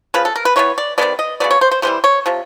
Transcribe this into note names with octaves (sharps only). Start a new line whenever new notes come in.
C#3 F3 B4
A4
A#4
B4
E3 G#3 B3 C#5
D5
C3 D#3 G#3 B3 D5
D#5
C#3 F#3 B3 D5
C#5
C5
C5
C3 E3 G3 C5
C#5
C3 F3